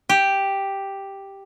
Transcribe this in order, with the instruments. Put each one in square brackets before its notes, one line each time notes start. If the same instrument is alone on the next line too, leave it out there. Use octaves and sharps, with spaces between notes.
[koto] G4